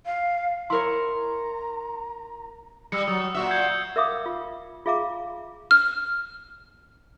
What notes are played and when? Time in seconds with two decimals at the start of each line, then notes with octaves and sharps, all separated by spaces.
0.06 F5
0.70 E4 A#4 C#5 A#5 C6
2.92 G3 E6 C#7
3.07 F#3 D#6
3.34 A#2 F#4 E5 E6
3.51 G6 G#6 C#7
3.96 A#4 E5 F5 D6 D#6
4.26 F4
4.86 F4 G#4 E5 F5 A#5 D6
5.71 F6